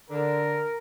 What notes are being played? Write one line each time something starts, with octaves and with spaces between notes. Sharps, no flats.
D3 A#4